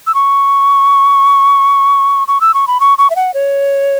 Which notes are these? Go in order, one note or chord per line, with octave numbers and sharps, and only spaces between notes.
E6
C#6
C#6
E6
C#6
B5
C#6
C#6
E5
F#5
C#5